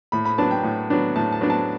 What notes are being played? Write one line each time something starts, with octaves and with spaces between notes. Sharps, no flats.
A2 B5
B5
F#3 B3 D4 A5
G5
A2
F#3 B3 D4
A2 A5
A5
F#3 B3 D4
A5